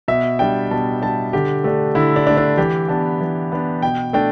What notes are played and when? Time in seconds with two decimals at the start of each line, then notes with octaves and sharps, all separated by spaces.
0.08 B2 E5
0.39 G3 D4 G5
0.71 B2 A5
1.01 G3 D4 A5
1.33 D3 G4
1.64 A3 D4 G4
1.95 D3 E4
2.16 D4
2.27 D4
2.30 A3
2.37 D4
2.57 E3 G4
2.88 B3 D4 A5
3.21 E3
3.52 B3 D4
3.82 B2 G5
4.13 A3 D4 G5